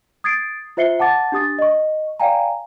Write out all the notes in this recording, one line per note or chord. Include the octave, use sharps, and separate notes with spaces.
D#6 G#6 A6 C7 D7
F4 C5 E5 C7 C#7 G7
F#5 A5 D6 A6
D4 G4 D#6 A6
D#5 C#6
D5 F5 G5 G#5 A#5